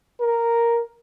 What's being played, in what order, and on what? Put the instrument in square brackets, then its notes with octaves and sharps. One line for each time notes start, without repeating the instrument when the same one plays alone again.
[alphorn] A#4